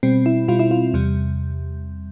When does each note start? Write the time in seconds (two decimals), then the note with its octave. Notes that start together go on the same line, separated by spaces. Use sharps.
0.03 B2 G3 C4
0.26 E4
0.48 B2 G3 F4
0.59 E4
0.71 F4
0.94 E2 C3 G3